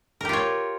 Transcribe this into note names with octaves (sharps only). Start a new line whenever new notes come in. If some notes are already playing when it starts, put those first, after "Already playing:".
F4 G4 A#4 C#5